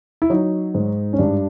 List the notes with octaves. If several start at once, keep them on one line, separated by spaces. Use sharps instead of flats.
E4
F#3 D#4
G#2
C#4
G2 D4